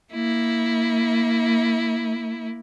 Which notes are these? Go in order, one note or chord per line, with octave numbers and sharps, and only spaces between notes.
A#3 E4